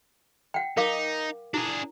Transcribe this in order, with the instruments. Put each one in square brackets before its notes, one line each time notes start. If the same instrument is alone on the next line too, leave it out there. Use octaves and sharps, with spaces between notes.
[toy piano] F#5 G5
[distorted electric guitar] D#4 [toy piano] A#4 F5 D6
[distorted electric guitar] D4 G#4 [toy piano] E4